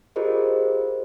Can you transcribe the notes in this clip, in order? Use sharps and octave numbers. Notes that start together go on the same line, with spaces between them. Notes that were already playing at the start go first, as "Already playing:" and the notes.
F4 G4 G#4 A#4 C5 D#5